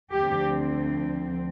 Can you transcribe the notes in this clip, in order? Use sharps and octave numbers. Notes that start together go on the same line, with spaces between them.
D2 D3 F3 C4 G4